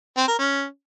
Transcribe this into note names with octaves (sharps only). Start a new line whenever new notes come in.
C4
A#4
C#4